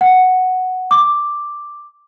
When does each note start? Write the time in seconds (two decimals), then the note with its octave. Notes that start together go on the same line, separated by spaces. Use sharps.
0.01 F#5
0.91 D6